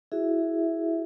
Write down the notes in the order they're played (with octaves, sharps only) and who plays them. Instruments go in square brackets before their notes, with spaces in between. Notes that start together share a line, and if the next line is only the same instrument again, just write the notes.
[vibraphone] E4 F#4 G#4 E5